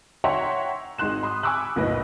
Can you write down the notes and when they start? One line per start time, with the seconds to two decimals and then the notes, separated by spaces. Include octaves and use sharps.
0.24 C#5 E5 F#5 G5 A#5 C6
0.98 G#1 G#3 D#4 C6 F#6 E7
1.23 B5 C6 D#6
1.43 G#5 B5 C#6 D6 E6 F#6
1.76 F#1 B1 A2 B4 D#5